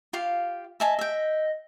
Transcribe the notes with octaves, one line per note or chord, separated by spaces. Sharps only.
F4 G4 F5
D#5 E5 G#5 A5
E5 G5